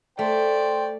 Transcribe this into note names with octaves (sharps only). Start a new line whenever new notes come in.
A3 C5 D5 G5